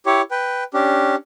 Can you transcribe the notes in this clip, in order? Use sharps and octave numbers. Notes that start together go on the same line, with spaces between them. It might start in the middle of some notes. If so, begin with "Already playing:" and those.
E4 G4 C#5
B4 G5
C#4 D4 G4